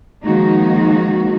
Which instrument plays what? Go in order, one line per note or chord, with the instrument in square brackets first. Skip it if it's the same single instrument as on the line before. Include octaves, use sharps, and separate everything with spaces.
[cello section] D#3 F3 G#3 A#3 D#4 F#4